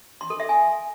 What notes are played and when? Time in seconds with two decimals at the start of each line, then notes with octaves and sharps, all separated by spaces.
0.21 C6
0.30 A4
0.40 E5
0.49 G#5